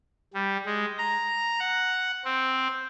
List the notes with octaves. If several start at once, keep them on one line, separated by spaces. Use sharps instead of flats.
G3
G#3
A#5
F#5
C4